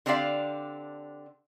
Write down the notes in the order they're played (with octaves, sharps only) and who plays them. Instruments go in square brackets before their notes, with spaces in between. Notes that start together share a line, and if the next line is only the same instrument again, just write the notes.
[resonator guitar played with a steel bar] D3 C4 D4 G4 D5 F5